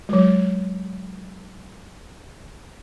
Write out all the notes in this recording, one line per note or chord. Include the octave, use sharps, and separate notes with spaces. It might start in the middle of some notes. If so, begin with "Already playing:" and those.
F#3 G#3